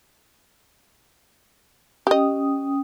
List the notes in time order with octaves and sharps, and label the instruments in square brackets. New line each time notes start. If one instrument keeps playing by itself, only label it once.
[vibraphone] C#4 G5 D#6 [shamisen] G4 D#5